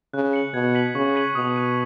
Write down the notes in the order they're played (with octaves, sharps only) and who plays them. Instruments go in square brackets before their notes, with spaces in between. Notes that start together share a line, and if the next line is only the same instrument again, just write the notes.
[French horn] C#3 [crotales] F#6
[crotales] C#7 F#7
[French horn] B2 [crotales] G#6
[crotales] B6 D#7 F#7
[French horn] C#3 [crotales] C#6
[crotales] G#6 B6 D#7 F#7
[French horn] B2 [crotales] D#6
[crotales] F#6 D#7